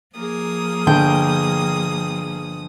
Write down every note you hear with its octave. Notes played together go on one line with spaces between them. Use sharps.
F3 A#3 G#4 D#6
G1 G5